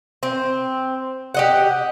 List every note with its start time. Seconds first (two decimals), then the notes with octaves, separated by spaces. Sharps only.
0.23 C4
1.34 G4 D#5 F#5